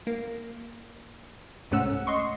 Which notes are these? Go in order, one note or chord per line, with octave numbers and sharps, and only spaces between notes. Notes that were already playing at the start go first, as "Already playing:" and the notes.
A#3
C2 G#2 A3 C#4 F#5 E6
D#5 C6 C#6